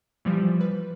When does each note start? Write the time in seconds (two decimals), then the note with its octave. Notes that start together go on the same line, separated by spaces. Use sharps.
0.25 E3 F3 G3
0.61 B4